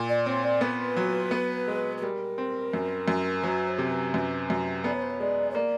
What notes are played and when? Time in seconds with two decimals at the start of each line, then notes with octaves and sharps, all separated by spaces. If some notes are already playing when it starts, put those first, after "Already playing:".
Already playing: A#2
0.08 D5
0.26 C4 C#5
0.43 D5
0.61 B3 B4
0.96 F#3
1.31 B3
1.68 G#3
1.97 B4
2.02 G3 A#4
2.38 C4
2.73 F#2
3.08 F#2
3.43 F#3 B4
3.68 C5
3.78 C3
3.90 B4
4.14 F#2 B4
4.50 F#2
4.84 B3 D5
4.93 C#5
5.02 C5
5.09 C#5
5.20 G#3 D5
5.50 C#5
5.55 A#3 D5